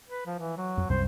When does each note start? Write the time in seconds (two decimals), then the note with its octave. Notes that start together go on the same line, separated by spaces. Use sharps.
0.09 B4
0.26 F3
0.39 E3
0.57 F#3
0.78 F2
0.90 C2 F#2 C3 C5